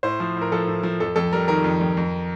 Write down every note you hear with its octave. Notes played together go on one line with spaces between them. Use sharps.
A2 C5
F3
A2
A#4
F3 A4
A2
F3
F2 A4
F2 A4
G3 A#4
D#3 A#4
F2
F2
F2